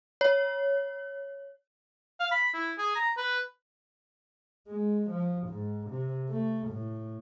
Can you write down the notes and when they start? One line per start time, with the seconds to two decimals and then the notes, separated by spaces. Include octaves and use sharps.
0.21 C#5
2.20 F5
2.32 B5
2.54 E4
2.78 G#4
2.96 A#5
3.17 B4
4.68 G#3
5.11 F3
5.49 G#2
5.91 C3
6.30 A3
6.69 A2